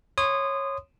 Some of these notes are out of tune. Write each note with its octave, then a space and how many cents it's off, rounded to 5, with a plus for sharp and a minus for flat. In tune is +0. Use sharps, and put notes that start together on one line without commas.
C#5 -15 C6 -30 D#6 -20